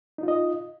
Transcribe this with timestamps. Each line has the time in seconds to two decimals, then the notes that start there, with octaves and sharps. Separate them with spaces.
0.18 D#4
0.23 F4
0.28 D#5